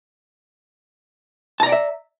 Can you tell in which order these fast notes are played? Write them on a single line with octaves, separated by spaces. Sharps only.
A5 A#5 D5 G5 E5